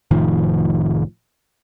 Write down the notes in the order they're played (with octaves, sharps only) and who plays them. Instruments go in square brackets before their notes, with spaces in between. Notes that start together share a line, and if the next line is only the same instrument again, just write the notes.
[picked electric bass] F1 A2 D#3 F3